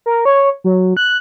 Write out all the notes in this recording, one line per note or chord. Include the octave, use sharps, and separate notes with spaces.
A#4
C#5
F#3
F#6